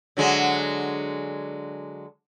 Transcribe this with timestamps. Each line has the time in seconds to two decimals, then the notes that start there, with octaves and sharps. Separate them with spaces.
0.17 D3 F#3 G#3